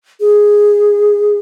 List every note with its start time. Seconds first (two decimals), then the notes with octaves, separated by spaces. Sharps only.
0.20 G#4